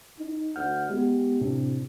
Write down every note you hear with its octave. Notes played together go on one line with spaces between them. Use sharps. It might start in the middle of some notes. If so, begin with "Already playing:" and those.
D#4
D2 F#5 F6 G6
G#3 B3 G4
A2 C3 D4